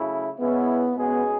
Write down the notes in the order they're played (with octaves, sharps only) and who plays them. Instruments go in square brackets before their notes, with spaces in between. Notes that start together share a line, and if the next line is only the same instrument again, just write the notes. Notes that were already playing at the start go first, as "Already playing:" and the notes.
Already playing: [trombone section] C#3 F#3 A3 E4
[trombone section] C#3 G#3 C#4 E4 [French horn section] B3
[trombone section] B2 G#3 C#4 G#4 [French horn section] B3